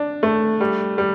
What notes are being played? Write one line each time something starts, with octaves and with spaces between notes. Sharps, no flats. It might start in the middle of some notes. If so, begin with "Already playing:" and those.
Already playing: D4
A3
G3
G3